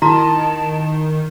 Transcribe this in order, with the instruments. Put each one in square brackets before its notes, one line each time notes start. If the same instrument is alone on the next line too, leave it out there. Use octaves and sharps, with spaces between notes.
[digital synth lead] D#3 [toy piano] E4 F#4 A#5 [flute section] A5